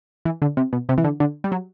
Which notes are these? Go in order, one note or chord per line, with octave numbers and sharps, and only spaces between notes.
E3
D3
C3
B2
C3
E3
D3
D3
G3
F#3